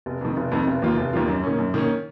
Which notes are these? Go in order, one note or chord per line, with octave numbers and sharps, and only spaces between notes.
F1
F2 D#3
F1
F2 D#3
F1
D#2 D#3 A#3 F4
F1
D#2 D#3 A#3 F4
F#2
D#3 A#3 C#4
F#2
D#3 A#3 C#4